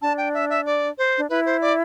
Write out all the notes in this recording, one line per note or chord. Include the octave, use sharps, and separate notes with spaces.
D4 A5
G5
E5
E5
D5
C5
D4
E4 B4
C5
D5